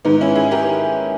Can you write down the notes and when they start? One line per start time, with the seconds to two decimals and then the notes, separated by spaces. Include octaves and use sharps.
0.05 G#2 D#3 B3 D#4
0.21 C#4 E4
0.35 E4 G#4
0.51 G4 A#4